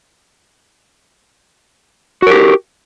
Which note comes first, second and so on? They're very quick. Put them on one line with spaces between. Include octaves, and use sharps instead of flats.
F#4 A#4 G4